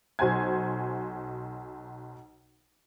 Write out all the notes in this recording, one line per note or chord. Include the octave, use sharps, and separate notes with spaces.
B1 F#4 C5 G#5 G#6